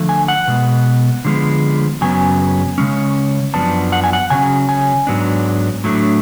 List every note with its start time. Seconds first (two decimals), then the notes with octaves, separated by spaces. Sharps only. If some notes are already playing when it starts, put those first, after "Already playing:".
Already playing: D3 F3 A3
0.09 G#5
0.28 F#5
0.48 B2 G#3 B3
1.25 D3 F3 G#3 B3
2.01 F#2 C#3 F#3 B3 G#5
2.78 C#3 G#3 C#4
3.54 F#2 F3 B3 D4 A5
3.92 F#5
4.04 G#5
4.13 F#5
4.30 C#3 F#3 C#4 G#5
4.69 G#5
5.07 G#2 F#3 B3 D4
5.84 A2 F#3 A3 D4